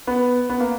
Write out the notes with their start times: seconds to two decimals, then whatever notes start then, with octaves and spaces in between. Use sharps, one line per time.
0.07 B3
0.50 B3
0.60 A#3